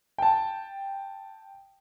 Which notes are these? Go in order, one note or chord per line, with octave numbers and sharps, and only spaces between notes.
G5 A5